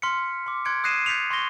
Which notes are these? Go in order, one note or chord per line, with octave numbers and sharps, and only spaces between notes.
C6 F6 B6 C#7
C6 D6
C6 F#6 G#6 C#7 D7
D#6 F#6 A#6 C7 D#7 E7
G6 A6 B6 C#7 F7
C6 C#6 F#6 G#6 A#6 G7